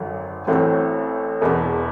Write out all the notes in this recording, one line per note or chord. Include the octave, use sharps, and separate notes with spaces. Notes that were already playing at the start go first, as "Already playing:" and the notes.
Already playing: G#1 F#2 D3 F#3
A1 A2 F#3 A3 C4
E1 E2 B2